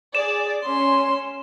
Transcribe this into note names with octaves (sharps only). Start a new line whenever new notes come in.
G#4 D5 E7
C#4 C6